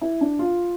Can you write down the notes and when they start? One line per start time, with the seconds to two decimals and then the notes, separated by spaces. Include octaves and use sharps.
0.01 E4
0.21 D4
0.39 F4